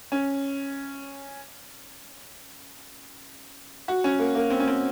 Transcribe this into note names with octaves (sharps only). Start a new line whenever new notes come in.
C#4
F#4
C#4
A#3
A#3
C4
C#4
C4